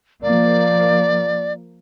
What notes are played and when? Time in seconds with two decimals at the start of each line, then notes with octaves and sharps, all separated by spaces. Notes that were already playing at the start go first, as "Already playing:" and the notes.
0.22 F3 A#3 D5